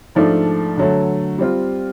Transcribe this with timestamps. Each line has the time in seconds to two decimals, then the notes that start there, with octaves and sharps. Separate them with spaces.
0.15 G#2 F3 A3 D4
0.77 D3 F#3 A3
1.38 G3 C4 F4